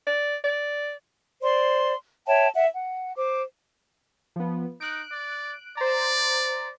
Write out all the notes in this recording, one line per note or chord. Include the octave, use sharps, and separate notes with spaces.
D5
D5
C5 D5 C6
C#5 E5 G5 A5
E5 F#5
F#5
C5 D6
F3 B3
D#4 F#6 D7
D5
C5 D5 A#5